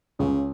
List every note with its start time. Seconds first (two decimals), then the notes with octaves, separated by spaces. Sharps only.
0.19 C#2 C#3